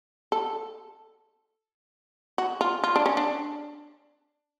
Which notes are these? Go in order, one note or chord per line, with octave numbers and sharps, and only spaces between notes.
A4
F#4
F4
F4
D4
C#4
D4